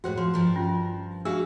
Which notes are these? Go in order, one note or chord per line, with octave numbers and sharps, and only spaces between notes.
A2 F#4 G#4 C5 F#5
F3 C6
G2 F3 A#4
C#4 F4
D4 F#4 G#4 E5 F5 E6